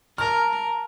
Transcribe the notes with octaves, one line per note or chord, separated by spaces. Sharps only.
A#4 A5 A#5 F6